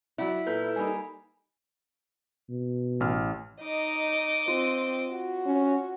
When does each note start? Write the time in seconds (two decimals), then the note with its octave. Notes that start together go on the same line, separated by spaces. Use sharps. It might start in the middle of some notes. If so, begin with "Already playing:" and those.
0.18 F#3 E4 D5 F#5
0.47 A#2 A4 B4 G6 B6
0.76 G3 A#3 D#4 G#5 B5
2.49 B2
3.00 A1 F6
3.61 D#4 D#5 D6
4.48 C4 F4
5.12 F#4
5.46 C#4